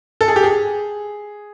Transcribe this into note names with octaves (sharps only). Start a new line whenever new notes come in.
A4
G#4
G4
G#4